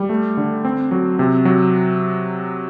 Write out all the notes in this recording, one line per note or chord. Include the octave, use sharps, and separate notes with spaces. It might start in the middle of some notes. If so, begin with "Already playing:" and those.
Already playing: G3
A3
D3
C4
F#3
C3
F#3